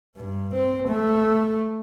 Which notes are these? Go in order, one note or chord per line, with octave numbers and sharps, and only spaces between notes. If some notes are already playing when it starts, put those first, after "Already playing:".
G2
C4
A3